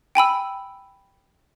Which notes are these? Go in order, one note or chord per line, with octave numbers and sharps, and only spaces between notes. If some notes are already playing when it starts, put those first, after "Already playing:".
G5 G#5 B5 E6